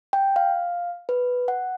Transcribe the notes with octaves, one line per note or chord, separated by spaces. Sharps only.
G5
F5
B4
F#5